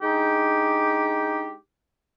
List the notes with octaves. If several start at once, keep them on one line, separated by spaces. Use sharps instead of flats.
G#3 D4 D#4 G4